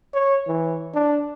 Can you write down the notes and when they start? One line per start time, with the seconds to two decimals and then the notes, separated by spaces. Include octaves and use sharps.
0.14 C#5
0.47 E3
0.94 D4